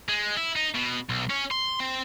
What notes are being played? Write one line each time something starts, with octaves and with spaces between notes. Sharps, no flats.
G#3
E4
D#4
B2
B1
C#4
C6
C4